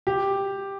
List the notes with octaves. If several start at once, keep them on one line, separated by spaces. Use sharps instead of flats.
G4